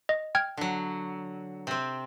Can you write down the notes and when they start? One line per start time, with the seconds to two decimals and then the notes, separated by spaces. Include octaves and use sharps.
0.09 D#5
0.35 G5 F6 G#6
0.57 D3 F#3
1.67 C3 C4